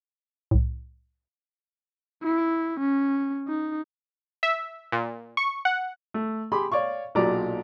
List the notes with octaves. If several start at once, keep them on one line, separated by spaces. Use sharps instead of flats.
C2 A2
E4
C#4
D#4
E5
A#2
C#6
F#5
A3
G4 G#4 B5 C6
C#5 D5 F5 C#6
B1 A#2 F#3 G4 D5 A#5